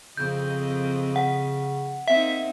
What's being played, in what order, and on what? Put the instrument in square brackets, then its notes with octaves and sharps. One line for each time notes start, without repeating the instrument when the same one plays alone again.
[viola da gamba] F2 C4 D#5 [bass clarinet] C#3 [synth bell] G6
[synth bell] F#5
[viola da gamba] A#3 C4 D#4 [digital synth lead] E5